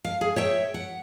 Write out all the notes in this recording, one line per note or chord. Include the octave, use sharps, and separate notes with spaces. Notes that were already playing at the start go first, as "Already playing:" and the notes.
F5
G#4
C#5 E5 G5
F#5